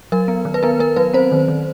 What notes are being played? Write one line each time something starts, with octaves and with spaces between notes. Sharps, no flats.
F#3 A#4
B3
D#3
B4
B3 A#4
B3 A#4
F#3 B4
C4 C5
D#3
D#3